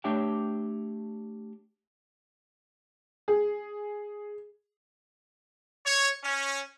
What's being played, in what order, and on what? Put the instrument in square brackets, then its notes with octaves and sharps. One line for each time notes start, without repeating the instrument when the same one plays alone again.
[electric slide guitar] A3 D4 G4 C#5 E5 G5
[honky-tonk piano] G#4
[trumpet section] C#5
C#4